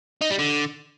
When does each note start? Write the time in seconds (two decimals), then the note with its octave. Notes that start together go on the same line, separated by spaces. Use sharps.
0.21 D#4
0.30 G3
0.39 D3